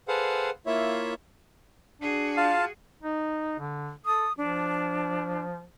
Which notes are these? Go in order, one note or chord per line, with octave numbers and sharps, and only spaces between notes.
G#4 A4 B4 C5 F5 F#5
A#3 E4 F4 C#5 E5
D4 F#4 G#4
F4 F5 A5
D#4
D3
A4 D#6
F3 D4